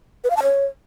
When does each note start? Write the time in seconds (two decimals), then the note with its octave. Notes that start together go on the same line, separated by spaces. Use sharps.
0.24 B4
0.30 F5
0.37 A5
0.43 C#5